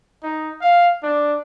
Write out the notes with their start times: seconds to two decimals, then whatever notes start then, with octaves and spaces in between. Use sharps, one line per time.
0.23 D#4
0.61 F5
1.03 D4